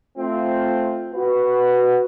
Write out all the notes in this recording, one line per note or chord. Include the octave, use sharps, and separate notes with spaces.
A3 C4 F4
F#4 B4